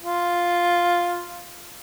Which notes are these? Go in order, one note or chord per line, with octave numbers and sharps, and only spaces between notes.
F4